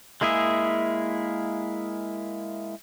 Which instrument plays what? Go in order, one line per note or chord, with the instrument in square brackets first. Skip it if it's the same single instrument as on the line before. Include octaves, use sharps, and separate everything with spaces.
[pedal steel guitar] G#3 A#3 E4 G#4 E5